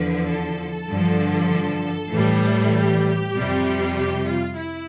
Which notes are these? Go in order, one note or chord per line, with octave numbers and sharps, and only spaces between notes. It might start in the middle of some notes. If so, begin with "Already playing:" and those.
Already playing: E2 D3 F3 B4
A4
G2 D3 F3
A2 E3 G3
G4
F2 C3 G3
G4
F4
E4